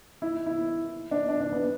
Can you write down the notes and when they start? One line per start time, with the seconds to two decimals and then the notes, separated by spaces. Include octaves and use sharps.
0.22 E4
0.46 E4
1.11 D4
1.29 D4
1.40 D4
1.52 B3